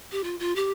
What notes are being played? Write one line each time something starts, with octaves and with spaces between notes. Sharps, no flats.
G4
F4
F4
G4